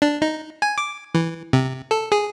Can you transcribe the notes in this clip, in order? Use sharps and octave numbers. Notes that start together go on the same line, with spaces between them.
D4
D#4
G#5
D6
E3
C3
A4
G#4